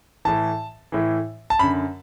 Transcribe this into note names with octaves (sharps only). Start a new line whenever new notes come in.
A2 E3 A5
A2 E3
A5
F#2 D3 B5